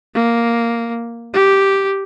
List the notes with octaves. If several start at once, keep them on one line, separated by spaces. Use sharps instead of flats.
A#3
G4